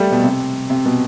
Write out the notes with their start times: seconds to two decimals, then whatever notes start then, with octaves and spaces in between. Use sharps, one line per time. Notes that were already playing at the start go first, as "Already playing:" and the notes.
Already playing: G3 A3
0.12 B2
0.23 C3
0.70 C3
0.85 B2